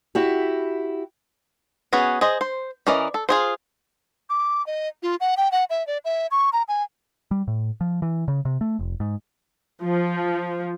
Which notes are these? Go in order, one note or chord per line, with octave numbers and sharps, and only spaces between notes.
E4 F#4 G4
B3 C#4 F#4 G#4
G#4 C5 D#5
C5
E3 C#4 A#4 D5 D#5
A4
F4 G#4 C5
D6
D#5
F4
F#5
G5
F#5
E5
D5
E5
C#6
A#5
G#5
G3
A2
F3
E3
C#3
C3
A3
F1
G#2
F3